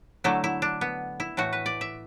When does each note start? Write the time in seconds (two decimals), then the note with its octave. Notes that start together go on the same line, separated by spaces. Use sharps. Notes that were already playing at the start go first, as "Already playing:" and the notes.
0.24 D3 F#3 A3 E4
0.44 E4
0.62 D4
0.81 B3
1.20 E4
1.37 A2 E3 A3 F#4
1.53 B4
1.66 D5
1.81 E5